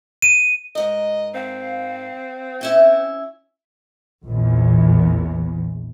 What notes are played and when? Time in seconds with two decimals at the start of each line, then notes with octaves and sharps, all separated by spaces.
0.22 D#7
0.75 G#2 A#4 D#5
1.34 C4 F5
2.61 C#4 E4 E5
4.26 A#1 E2